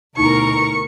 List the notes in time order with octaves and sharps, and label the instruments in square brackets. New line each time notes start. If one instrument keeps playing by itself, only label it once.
[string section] D2 B2 A#4 [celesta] D#4 E4 [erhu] C#6